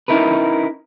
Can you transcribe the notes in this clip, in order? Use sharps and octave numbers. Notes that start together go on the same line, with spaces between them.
C#4 D#4 E4 A#4 B4